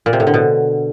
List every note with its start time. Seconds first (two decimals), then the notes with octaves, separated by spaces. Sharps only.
0.06 A#2
0.13 C3
0.20 A2
0.27 D3
0.34 B2